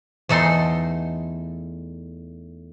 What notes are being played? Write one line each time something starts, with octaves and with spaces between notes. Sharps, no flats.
E2 A3 D#4 A4 C6